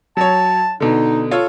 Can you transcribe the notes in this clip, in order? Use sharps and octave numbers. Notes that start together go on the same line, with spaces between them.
F#3 C#5 A5
B2 D3 D#4
F4 A4 C#5